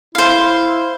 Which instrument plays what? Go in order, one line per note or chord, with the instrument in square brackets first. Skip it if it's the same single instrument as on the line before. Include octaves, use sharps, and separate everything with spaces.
[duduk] E4 [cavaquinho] C5 F5